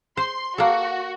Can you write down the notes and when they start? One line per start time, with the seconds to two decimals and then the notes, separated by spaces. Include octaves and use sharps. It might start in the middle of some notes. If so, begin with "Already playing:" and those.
0.17 C5 C6
0.58 A#3 F#4 A4